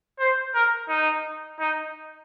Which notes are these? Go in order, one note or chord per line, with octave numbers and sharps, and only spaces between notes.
C5
A#4
D#4
D#4